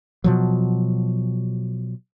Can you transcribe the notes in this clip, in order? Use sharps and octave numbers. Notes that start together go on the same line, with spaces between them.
B2 F3 F#3